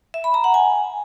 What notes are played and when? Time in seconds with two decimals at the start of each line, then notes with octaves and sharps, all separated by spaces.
0.14 E5
0.24 B5
0.34 A#5
0.44 F#5
0.54 G#5